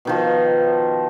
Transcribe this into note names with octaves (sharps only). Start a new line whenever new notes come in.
B2 D#3 F3